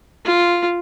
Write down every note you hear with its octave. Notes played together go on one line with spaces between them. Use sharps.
F4